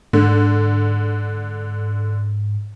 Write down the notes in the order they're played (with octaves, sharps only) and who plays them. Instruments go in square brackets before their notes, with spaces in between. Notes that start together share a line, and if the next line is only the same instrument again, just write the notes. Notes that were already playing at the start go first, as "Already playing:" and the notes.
[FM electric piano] G#2 [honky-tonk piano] D3